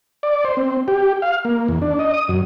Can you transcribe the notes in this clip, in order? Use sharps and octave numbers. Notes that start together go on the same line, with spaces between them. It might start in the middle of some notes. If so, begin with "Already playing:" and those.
D5
C5
C4
G4
F5
A#3
E2
D4
D#5
D#6
F#2